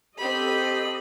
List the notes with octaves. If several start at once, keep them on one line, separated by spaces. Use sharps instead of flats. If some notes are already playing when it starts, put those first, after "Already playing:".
C4 G4 A4 D#5 B5